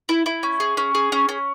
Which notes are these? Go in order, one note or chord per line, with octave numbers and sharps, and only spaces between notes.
E4
E4
C#4
G#4
C#4
G#4
C#4
C#4